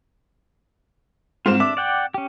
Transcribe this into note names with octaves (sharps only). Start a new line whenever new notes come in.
G#2 C4 F4 E7
D4 E5 D6
D5 F#5 G5
C#4 G4